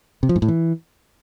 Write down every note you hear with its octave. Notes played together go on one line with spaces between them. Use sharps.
C3
F3
G#2
A2
E3